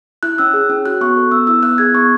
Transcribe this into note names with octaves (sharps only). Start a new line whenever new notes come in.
E4 F#6
C#4 E6
G#4
C#4
F#4 F#6
B3 C#6
A4
B3 E6
E4 E6
B3 F#6
G#4 G#6
B3 C#6